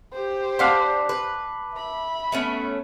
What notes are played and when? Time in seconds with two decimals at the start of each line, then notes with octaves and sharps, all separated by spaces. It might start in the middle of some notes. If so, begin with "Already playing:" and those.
0.13 G4 C5
0.59 D4 D5 F5 F#5 A5 C6 D6 B6
1.09 B4
1.74 E5 B5
2.32 A3 B3 C#4